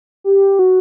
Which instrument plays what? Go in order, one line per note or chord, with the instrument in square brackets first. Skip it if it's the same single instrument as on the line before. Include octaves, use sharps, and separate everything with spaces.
[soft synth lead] G4
F#4